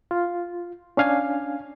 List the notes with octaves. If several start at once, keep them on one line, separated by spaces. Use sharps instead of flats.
F4
C#4 D4 F5 G#5